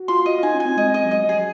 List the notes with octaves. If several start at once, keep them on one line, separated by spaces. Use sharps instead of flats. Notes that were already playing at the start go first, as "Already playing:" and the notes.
Already playing: F#4
F4 C6
D#5
F4
D#4 G#5
C#4
G#5
C4
G#3 D#5
D#5
F#3
G#3 D#5
F#3
G#4
F#3